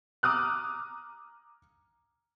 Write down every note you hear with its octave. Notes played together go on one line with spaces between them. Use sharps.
A#5 D6 D#6 F6 F#6